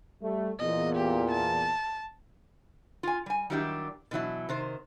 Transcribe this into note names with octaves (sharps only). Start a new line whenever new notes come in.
G3 A3
E2 A#2 D#5
G4
A5
F4 G#5
G3 G#5
D#3 F#3 G3 D4 E4 G4
B2 E3 F#3 E4
C3 D#3 C5